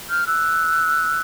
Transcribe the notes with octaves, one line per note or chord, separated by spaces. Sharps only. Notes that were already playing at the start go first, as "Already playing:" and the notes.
F6 G6
E6 F#6